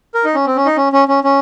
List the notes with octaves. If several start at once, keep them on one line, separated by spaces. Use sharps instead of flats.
A#4
D#4
C#4
C4
C#4
D#4
C#4
C#4
C#4
C#4